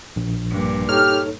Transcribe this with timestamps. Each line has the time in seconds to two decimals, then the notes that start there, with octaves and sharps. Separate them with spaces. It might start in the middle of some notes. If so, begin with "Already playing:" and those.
0.16 A#1
0.50 G2 A#2
0.89 D#4 G4 A4 C#5 F6